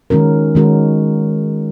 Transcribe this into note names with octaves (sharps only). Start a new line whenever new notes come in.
D#3 G#3 C#4 F#4 A#4
D#3 G#3 C#4 F#4 A#4